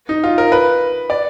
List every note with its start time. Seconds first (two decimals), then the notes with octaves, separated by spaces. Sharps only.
0.09 D#4
0.24 F4
0.38 A#4
0.52 B4
1.10 D5